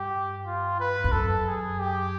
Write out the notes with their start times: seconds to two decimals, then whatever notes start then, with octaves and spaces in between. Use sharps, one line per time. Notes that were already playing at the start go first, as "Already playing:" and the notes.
Already playing: G2 G4
0.46 F4
0.80 B4
1.04 F2
1.12 F#2 A4
1.46 G#4
1.79 G4